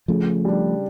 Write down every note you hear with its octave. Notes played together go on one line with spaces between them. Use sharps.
C#3 F3 A3
G3 D4